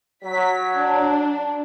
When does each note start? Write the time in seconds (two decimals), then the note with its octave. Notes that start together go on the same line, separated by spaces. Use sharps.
0.24 F#3 B6
0.75 D4